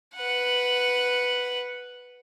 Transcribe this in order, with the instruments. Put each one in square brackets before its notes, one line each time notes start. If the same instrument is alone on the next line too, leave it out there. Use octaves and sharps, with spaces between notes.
[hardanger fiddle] B4 F#5